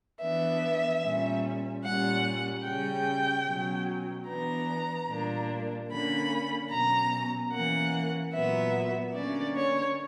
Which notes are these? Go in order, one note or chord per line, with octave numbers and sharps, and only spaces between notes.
E3 B3 D4 E5
A#2 G3 C#4
A#2 G3 C#4 F#5
C#3 G3 C#4 G5
B2 F#3 C#4
E3 B3 D4 A#5
A#2 G3 A#3 D4
D3 A#3 C#4 B5
B2 F#3 C#4 A#5
E3 A#3 C#4 F#5
A#2 F#3 B3 E5
D3 A#3 C#4 D5
C#5